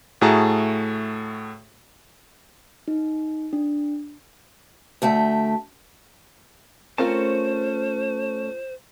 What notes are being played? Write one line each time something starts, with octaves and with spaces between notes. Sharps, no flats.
A2 A3 F#4 G#4 A5 A#5
D#4
D4
D2 A3 E5 G5
A3 C4 C#4 F4 A#4 C5 A5